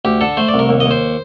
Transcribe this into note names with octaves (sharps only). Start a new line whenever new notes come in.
D2 G4
D3 A4
A3 C5
D5
C2
A#4
D#2
D#5
D#2
C5